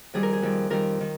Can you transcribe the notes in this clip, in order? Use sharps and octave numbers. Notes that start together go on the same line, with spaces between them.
F2 D#3 G3 G#4
A#4
G#4
F2 D#3 G3
F2 D#3 G3 A#4
D#3